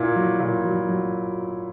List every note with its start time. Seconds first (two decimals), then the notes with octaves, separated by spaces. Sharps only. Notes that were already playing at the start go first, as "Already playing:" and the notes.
Already playing: A#2 E4
0.16 F#3
0.40 A#2
0.65 F#3
0.89 F#3